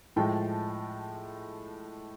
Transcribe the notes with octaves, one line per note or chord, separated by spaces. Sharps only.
A2 F3 G#3 G5 A5